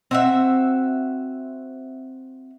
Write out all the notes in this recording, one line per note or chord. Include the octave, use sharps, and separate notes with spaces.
C4 F#4 E5